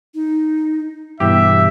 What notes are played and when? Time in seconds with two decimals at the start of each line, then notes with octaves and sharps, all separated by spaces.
0.15 D#4
1.20 G2 B2 E3 B3 G4 E5